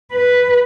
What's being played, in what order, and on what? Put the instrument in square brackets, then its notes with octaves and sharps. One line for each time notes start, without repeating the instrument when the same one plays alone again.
[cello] B4